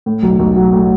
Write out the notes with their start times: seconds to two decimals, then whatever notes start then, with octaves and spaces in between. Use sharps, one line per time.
0.06 A2
0.23 B1
0.39 B1
0.56 F#3
0.73 A2